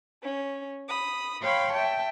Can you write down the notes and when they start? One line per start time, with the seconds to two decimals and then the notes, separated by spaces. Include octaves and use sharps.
0.22 C#4
0.89 B5 D#6
1.42 C#5 F5 G5 B5 C6
1.72 E5 G5 A5